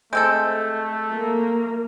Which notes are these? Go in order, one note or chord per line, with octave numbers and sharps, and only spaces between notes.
G#3 A3 C4 A4 E6 G6
A#3